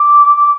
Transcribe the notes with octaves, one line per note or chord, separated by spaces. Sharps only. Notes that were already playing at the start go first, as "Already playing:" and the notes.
Already playing: D6
D6